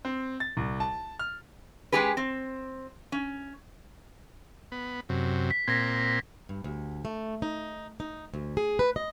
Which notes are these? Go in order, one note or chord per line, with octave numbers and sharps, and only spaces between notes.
C4
A6
C2
A5
F6
G#3 C#4 G4 G#4 B4
C4
C#4
B3
F#2 C3
B6
A#2 C4 G#6 A#6 B6
G2
D2
A3
D#4
D#4
D2
G#4
B4
D#5